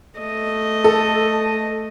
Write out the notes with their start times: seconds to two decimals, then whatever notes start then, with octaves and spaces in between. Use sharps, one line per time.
0.19 A3 D#5
0.84 A4